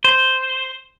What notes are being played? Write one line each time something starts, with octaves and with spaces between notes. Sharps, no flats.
C5